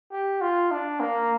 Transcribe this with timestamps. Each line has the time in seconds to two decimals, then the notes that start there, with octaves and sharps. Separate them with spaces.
0.12 G4
0.41 F4
0.71 D4
1.00 A#3